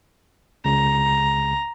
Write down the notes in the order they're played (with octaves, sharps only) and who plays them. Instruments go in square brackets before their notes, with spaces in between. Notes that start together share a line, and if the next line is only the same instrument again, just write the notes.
[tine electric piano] C#2 C#3 [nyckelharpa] A#5